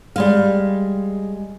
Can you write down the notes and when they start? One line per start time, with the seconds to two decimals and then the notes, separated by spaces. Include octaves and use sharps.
0.16 G3 G#3 F5